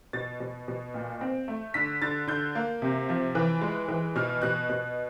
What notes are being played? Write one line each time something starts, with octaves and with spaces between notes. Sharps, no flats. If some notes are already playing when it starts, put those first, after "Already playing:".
B2 A6
B2
B2
A#2
C4
A3
D3 B6
D3 A6
D3 G6
A#3
C3
F3
E3
G#3
E3
B2 F6
B2 F#6
B2 F#6